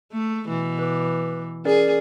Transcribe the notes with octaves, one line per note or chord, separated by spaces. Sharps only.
A3
B2 E3
B4 D6
C#4 G#4 A#4 D5